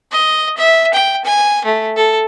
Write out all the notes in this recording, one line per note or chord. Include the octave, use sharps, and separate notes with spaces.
D#5
E5
G5
G#5
A3
A4